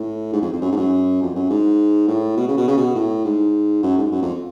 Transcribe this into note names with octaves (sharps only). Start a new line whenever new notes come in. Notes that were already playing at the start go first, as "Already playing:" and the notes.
Already playing: A2
G#2
F2
F2
F#2
G#2
F#2
F2
F#2
G#2
A2
B2
C#3
B2
C#3
B2
A2
G#2
F#2
G#2
F#2
F2